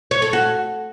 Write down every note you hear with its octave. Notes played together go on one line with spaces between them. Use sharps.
C#5
A4
F#4